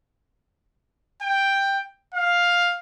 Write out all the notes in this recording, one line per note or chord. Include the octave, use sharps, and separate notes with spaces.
G5
F5